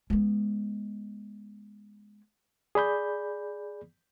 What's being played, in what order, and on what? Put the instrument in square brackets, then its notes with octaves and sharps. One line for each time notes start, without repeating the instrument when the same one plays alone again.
[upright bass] G#3 B3
[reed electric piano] G#4 D5 B5 G6